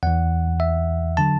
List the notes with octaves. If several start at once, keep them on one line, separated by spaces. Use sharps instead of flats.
E2 E3 F#5
E5
D3 F#3 A5